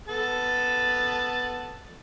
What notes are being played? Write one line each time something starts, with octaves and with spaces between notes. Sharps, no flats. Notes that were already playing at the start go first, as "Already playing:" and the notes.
B3 A4 A5